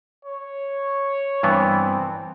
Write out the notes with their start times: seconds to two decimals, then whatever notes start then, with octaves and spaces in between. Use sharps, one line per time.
0.25 C#5
1.43 G2 E3 B3 C4